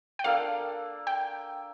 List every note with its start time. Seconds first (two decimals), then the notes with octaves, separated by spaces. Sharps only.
0.19 G5
0.24 A#3 D4 A4 D5 F5
1.07 G5